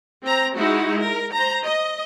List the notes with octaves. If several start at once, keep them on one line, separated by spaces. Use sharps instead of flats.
C4 A#5
G#3 D#4 E4 F#4
A#4
C5 A#5
D#5